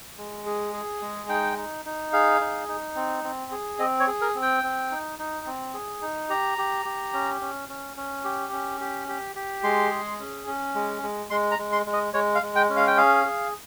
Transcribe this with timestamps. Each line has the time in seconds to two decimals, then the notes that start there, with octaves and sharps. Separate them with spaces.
0.18 G#3
0.46 G#4
0.73 G#4
1.01 G#3
1.29 D#4 G5
1.57 D#4
1.85 D#4
2.13 G#4 F5
2.41 D#4
2.68 D#4
2.96 C4
3.24 C4
3.52 G#4
3.79 C4 D#5
4.00 C#5
4.07 G#4
4.21 A#4
4.35 C4
4.42 G5
4.63 C4
4.91 D#4
5.19 D#4
5.46 C4
5.74 G#4
6.02 D#4
6.30 G4 A#5
6.58 G4
6.85 G4
7.13 C#4
7.41 C#4
7.69 C#4
7.97 C#4
8.24 G4
8.53 C#4
8.80 G4
9.08 G4
9.36 G4
9.63 G#3 C6
9.91 G#4
10.20 C#4
10.47 C#4
10.75 G#3
11.03 G#3
11.30 G#3 C6
11.51 A#5
11.58 G#3
11.72 C6
11.86 G#3
11.93 D#5
12.14 G#3 C#5
12.35 F5
12.42 G#3
12.56 G5
12.70 C#4
12.77 F5
12.87 G5
12.97 G#4 F5
13.25 G#4